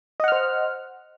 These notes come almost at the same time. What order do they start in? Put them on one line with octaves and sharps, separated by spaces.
D#5 F#5 F6 C5